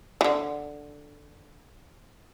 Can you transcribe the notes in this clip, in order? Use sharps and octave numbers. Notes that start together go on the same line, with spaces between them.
D3 E3